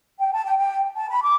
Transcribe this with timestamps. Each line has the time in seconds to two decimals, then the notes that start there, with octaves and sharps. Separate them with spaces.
0.20 G5
0.33 A5
0.45 G5
0.58 G5
0.96 A5
1.09 B5
1.23 D6